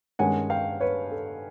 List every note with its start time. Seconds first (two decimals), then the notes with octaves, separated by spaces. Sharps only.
0.19 G2 D#3 G#3 C#4 F#5 G#5
0.50 F5 G5
0.81 B4 C#5
1.11 A4